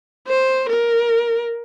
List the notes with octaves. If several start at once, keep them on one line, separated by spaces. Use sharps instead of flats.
C5
A#4